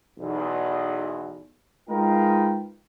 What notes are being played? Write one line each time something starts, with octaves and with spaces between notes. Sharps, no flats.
B1 E2
G#3 D#4 F4 A#4 B4 G5